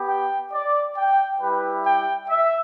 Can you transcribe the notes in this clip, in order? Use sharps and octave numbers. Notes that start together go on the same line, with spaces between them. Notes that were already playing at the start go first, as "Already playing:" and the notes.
Already playing: B3 G4
G5
D5
G5
G3 E4 G4 B4
G5
E5